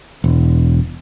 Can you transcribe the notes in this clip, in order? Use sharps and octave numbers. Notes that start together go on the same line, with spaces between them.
E1